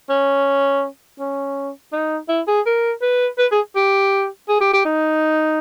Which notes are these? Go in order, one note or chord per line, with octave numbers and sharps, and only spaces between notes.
C#4
C#4
D#4
E4
G#4
A#4
B4
B4
G#4
G4
G#4
G4
G4
D#4